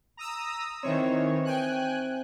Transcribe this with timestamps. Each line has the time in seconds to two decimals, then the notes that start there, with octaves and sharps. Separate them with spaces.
0.17 A#5 D#6 E6
0.83 D#3 E3 C4 C5 C#5 E5
1.45 G5 G#5 F#6